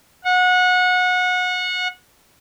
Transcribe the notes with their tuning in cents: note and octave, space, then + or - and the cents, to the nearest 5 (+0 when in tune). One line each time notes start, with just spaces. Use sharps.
F#5 -25